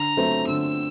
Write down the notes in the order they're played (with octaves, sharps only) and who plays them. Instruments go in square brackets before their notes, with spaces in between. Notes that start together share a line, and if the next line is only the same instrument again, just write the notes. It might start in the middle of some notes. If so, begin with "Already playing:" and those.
Already playing: [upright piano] D3 [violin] A#5
[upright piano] F#3 A3 C4
[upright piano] D3 [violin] E6